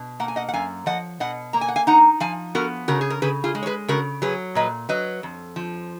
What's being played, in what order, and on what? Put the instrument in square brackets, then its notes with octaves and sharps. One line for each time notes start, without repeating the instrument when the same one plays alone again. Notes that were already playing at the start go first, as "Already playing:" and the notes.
Already playing: [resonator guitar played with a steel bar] B2
A#3 F#5
G#5
D#5 F#5
F#5
F#2 F5 G#5
F3 D#5 F#5
B2 D#5 F#5
A#3 A#5
G#5
F#5
F5 G#5
D#4 F#5 A#5
F3 F5 G#5
B3 F#4 A#4
C#3 F#4 A#4
G#4
A#4
C#3 G#4 B4
F4 G#4
G#3
C#5
G#4 B4
C#3 F#4 A#4
F#3 G#4 B4
A#2 B4 D#5
F#3 B4 D#5
F2
F3